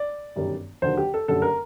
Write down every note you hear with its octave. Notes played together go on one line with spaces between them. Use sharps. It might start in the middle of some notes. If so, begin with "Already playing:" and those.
Already playing: D5
G1 F#2 D#3 G3
D#2 D3 F#3 C5
G4
A4
F#1 F#2 D3 G3 A4
A#4